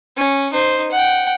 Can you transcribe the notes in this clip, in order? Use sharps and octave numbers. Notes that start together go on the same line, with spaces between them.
C#4
D#4 C5
F#5 G5